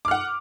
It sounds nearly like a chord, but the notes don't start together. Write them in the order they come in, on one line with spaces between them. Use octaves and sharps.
D6 F6 F#5